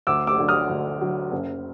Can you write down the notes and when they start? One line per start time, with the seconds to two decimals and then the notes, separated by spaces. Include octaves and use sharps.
0.07 D2 D6 E6
0.27 D6 E6
0.38 D3 F#3
0.48 D#6 F6
0.69 D2
1.00 D3 F#3
1.32 F#1